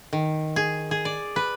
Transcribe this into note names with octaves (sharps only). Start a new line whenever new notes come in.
D#3
G#4
G#4
D5
B4